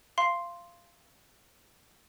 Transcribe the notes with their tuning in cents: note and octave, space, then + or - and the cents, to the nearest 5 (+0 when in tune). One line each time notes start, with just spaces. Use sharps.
F5 -20 C6 +0